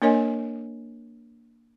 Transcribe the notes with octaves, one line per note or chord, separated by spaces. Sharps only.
A#3 D4 A#4 C#5 D#5 G#5